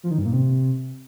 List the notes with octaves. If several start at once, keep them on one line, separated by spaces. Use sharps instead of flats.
F3
D#3
G2
A#2
C3